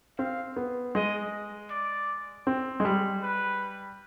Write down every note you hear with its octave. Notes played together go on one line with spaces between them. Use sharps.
C4 F5
B3
G#3 D#5
D5
C4
G#3
G3
B4